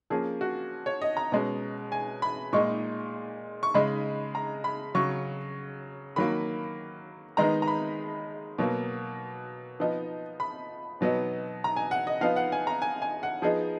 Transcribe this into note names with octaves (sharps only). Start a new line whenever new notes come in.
F3 A#3 C#4 G#4
F#4
C#5
D#5
A#5
B2 G#3 C#4
G#5
B5
A#2 G#3 D#4 C#6
C#6
C#3 G#3 D#4 B5
A#5
B5
C#3 F#3 C#4 C#6
D#3 F#3 A#3 B5
D#3 G#3 B3 D#4 A#5
A#5
B5
B2 F#3 A#3
F3 B3 D#4
B5
B2 F#3 B3 D#4
A#5
G#5
F#5
D#5
F3 B3 D#4 F5
F#5
G#5
A#5
G#5
G#5
F#5
F3 B3 D#4 G#4